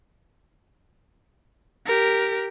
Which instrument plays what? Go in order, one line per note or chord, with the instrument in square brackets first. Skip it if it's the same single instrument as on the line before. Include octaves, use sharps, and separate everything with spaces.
[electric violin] G4 A#4